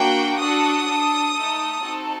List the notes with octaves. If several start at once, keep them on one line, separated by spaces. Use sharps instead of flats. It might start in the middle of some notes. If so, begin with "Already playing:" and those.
Already playing: A#3 D4 F#4 G5
D4 F#4 A4 D#6
D4 A4
A3 D#4 A4
C4 D#4 F#4 A4